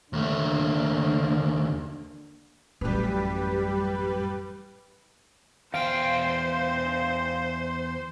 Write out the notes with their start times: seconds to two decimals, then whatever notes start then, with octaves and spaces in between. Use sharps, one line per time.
0.13 D#2 D3 A3 A#3
2.81 A1 F#2 G3 G4 B4
5.74 E2 C5 F5 G5